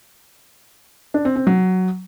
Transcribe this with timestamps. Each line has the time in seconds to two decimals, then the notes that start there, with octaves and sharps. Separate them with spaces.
1.14 D4
1.25 C4
1.36 C4
1.47 F#3